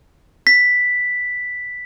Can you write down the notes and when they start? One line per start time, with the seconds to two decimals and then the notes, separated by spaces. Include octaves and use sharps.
0.47 B6